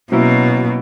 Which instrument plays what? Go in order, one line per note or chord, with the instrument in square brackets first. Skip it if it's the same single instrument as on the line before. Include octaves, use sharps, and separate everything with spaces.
[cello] B2 [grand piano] F#3 A#3 C#4 E4